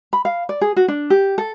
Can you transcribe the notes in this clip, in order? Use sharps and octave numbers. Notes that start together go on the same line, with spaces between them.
B5
F5
D5
G#4
F#4
D4
G4
A4